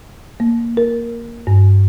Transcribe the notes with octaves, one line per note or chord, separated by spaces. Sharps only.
A#3
A#4
G2